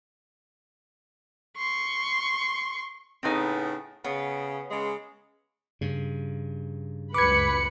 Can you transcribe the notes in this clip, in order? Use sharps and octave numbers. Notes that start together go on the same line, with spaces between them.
C6 C#6
A2 C#3 B3 C4 D#4 A#5
C#3 B3
C#3 G#3
G2 C#3
C#2 F#2 B4 B5 D6 G#6 C#7